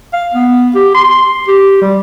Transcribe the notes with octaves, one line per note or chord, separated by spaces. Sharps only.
F5
B3
G4
C6
G4
G3